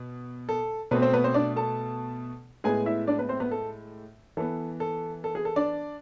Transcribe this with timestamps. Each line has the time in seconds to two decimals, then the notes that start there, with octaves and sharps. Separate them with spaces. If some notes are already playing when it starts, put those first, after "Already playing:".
Already playing: B2
0.49 A4
0.91 B2 A3 B3 C4 B4
1.02 C4 C5
1.13 B3 B4
1.24 C4 C5
1.34 D4 D5
1.56 A4 A5
2.64 A2 G#3 B3 G#4 G#5
2.86 E4 E5
3.07 D4 D5
3.19 B3 B4
3.29 C4 C5
3.40 B3 B4
3.51 A4
4.37 E3 B3 A4
4.80 A4
5.24 A4
5.35 G#4
5.45 A4
5.56 D4 D5